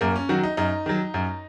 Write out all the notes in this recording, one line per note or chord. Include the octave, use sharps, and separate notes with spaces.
F#2 A#3
C#4
D#3 F#3 F#4
D#4
F#2 D#4
D#3 F#3
F#2